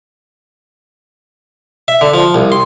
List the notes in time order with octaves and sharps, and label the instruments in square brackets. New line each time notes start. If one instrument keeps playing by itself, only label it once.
[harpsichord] E5
D3
F3
C2
C6